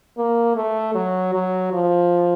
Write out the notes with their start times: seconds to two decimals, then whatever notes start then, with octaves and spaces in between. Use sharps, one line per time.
0.17 A#3
0.56 A3
0.95 F#3
1.34 F#3
1.73 F3